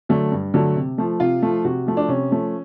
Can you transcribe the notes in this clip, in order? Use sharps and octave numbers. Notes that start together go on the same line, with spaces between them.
D3 F#3 A3
G2
D3 F#3 A3
C3
F3 A3
C3 F4
F3 A3
C3 F#4
F3 A3
D4
C3 C#4
F3 A3